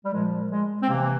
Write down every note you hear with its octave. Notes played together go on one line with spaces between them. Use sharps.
G3
A#2 F3 G#3
G#3
C4
C3 E3 A#3